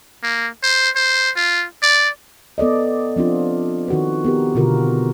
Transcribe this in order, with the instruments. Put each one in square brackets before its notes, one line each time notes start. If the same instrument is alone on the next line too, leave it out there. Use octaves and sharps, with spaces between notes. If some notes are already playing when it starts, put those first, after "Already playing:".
[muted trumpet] A#3
C5
C5
F4
D5
[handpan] B3 A4 D5 D#5
F3 C4 D4 F4
D#3 F#4 B4
B3 G4 A#4
B2 D3 F4 F#4 A#4